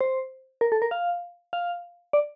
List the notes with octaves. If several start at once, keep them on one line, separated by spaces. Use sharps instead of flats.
C5
A#4
A4
A#4
F5
F5
D5